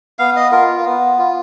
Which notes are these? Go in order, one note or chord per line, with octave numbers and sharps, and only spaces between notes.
B3 F5
D#5
F4 A#4
B3
F4